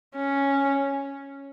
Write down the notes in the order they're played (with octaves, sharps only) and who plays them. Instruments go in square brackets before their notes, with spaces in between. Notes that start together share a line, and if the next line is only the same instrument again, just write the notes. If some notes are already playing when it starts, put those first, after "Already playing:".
[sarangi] C#4